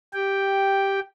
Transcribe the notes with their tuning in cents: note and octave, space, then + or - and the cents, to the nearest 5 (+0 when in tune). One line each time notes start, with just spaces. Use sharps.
G4 +0 G5 +0